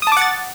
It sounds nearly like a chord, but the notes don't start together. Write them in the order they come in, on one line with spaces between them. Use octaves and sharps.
D#6 A5 D6 F#5 A6